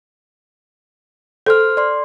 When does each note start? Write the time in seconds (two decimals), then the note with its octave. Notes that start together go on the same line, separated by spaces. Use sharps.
1.46 A4 C5 C6 F6
1.77 D5 C6